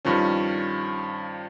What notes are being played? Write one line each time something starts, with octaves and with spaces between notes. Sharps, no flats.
G2 D#3 F3 C#4